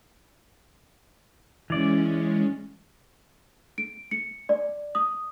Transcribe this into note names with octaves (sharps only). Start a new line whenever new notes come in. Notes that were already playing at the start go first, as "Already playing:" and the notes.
E3 G#3 C#4 D5
D7
C#7
D5
D#6